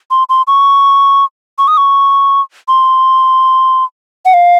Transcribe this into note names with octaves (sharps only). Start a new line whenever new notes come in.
C6
C6
C#6
C#6
D#6
C#6
C6
F#5
F5